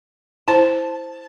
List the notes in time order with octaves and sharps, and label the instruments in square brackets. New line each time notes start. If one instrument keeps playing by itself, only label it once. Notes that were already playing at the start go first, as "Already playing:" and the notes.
[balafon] E4 C5 [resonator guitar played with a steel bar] A5